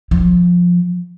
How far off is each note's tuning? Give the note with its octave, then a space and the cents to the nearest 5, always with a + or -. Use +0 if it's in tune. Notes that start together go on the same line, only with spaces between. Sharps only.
F3 +15